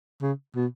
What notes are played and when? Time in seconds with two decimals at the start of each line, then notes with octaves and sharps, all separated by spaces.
0.22 C#3
0.56 B2